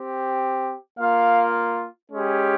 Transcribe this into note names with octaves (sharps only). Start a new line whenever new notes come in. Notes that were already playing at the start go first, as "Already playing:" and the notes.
Already playing: C4 G4
A#3 F4 F5
G#3 C#4 G4